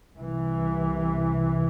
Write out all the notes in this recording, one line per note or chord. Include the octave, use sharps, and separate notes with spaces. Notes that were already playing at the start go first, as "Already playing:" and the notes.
C2 C3 E3